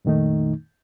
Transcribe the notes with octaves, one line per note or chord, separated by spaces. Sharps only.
F2 A#2 D#3 A3 D#4